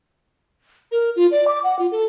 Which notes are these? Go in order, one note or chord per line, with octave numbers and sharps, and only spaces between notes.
A#4
F4
D5
D6
F#5
F4
A4